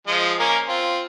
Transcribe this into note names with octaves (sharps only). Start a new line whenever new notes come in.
F3 G#3 D#5
A#3 C#4 A#4
C4 F4